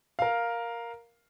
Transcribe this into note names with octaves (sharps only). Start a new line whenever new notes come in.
A#4 F5